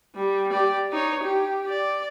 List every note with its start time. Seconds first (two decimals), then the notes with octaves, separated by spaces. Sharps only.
0.15 G3
0.51 G4 D5
0.92 D#4 C#5
1.23 G4
1.69 D5